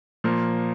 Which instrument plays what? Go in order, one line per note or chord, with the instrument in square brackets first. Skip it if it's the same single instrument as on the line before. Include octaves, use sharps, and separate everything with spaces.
[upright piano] A#2 F3 A#3